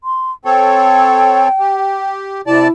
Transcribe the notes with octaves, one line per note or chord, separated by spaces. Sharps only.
C6
C4 A4 C#5 G5
G4
C3 E4 D5 A5